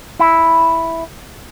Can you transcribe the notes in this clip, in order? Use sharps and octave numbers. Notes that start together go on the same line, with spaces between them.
E4